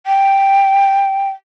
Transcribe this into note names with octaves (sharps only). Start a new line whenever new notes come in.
G5